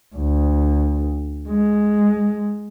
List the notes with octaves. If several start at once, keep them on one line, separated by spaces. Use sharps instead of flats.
D2
G#3